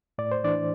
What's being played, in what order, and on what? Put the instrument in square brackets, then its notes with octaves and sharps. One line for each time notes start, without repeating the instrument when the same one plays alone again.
[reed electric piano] A2 D5
C5
E3 D4 D5